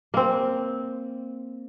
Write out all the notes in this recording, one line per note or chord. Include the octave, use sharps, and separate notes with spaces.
A#3 C4